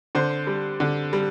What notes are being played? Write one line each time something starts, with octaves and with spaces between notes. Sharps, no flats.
D3 C5
G3
D3
G3